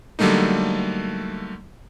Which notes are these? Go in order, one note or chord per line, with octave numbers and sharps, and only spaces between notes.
D3 F#3 G3 A3 A#3 D#4